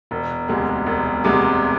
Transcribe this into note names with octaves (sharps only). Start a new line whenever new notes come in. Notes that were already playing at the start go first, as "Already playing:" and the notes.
E1
D2 C3 G#3
E1
D2 C3 G#3